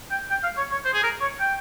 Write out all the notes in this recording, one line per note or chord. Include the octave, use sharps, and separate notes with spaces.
G5
G5
F5
C#5
C#5
C5
G#4
A#4
C#5
G5